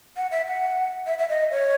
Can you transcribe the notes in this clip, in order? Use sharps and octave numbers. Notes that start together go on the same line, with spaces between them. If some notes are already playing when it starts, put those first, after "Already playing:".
F#5
E5
F#5
E5
E5
D#5
C#5